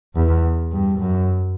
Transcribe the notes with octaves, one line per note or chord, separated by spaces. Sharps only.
E2
G2
F#2